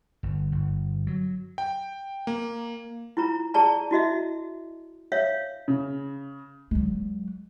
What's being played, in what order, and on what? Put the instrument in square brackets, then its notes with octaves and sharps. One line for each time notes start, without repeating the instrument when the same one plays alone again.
[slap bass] G1
G1
F#3
[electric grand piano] G5
A#3
[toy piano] E4 F4 A#5
G#4 D5 A5 A#5
E4 F#4 D#5 E5
C#5 E5 F5
[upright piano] C#3
[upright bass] F#3 G#3